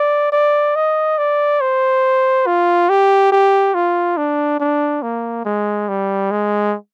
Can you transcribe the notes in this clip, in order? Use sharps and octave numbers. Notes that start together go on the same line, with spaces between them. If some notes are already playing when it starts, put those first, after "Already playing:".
Already playing: D5
D5
D#5
D5
C5
F4
G4
G4
F4
D4
D4
A#3
G#3
G3
G#3